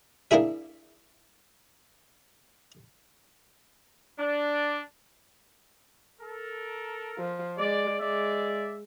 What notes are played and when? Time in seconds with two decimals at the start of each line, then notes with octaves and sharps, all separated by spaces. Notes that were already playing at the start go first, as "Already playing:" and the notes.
0.31 A#3 D4 E4 G#4 E5
4.18 D4
6.20 A4 A#4
7.18 F3
7.58 G#3 D5
8.00 G#3 D5 E5